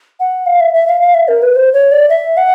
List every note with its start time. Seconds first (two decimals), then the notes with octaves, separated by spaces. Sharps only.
0.20 F#5
0.46 F5
0.60 E5
0.74 E5
0.87 F5
1.01 F5
1.14 E5
1.28 A#4
1.42 B4
1.56 C5
1.73 C#5
1.92 D5
2.09 E5
2.37 F#5